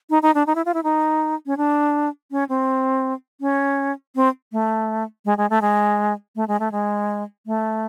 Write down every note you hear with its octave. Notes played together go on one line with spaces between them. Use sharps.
D#4
D#4
D4
D#4
E4
F4
E4
D#4
C#4
D4
C#4
C4
C#4
C4
A3
G#3
G#3
A3
G#3
A3
G#3
A3
G#3
A3